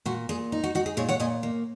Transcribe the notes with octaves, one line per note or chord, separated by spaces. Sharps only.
A#2 F#4
A#2 G#4
D#4
F#4
D#4 F#4
G#4
A#2 G#4 C#5
C#5 F#5
A#2 D#5 G#5
A#3